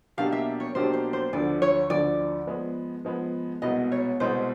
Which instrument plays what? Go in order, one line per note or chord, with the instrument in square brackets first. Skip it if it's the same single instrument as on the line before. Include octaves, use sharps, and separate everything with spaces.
[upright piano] B2 F#3 A#3 D4 G4 [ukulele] F5
[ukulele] E5
C#5
[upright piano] B2 F#3 A#3 D4 G4 [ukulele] C5
[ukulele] C5
C5
[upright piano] D2 D3 F3 [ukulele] D5
[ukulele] C#5
[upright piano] D2 D3 F3 [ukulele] D5
[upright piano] F3 G#3 B3
F3 G#3 B3
[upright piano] C2 B2 G#3 B3 [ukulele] D#5
[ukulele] C#5
[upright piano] C2 B2 G#3 B3 [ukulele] C5